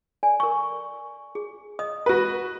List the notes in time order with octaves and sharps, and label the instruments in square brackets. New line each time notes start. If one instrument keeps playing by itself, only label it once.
[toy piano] A4 D5 G#5
A#4 C#6
G#4
D#5 D#6
[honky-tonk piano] F#4 B4